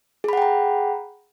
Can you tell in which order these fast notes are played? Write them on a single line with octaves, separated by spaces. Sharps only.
G#4 B5 F#5 G5 A#5